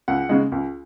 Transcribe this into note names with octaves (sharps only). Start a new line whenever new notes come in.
C#2 F#5
C#3 G#3
C#2